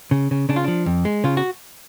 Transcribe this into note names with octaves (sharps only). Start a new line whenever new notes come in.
C#3
C#3
C#3 D4
F4
F3 D4
F2
G#3
C#3 F4
F#4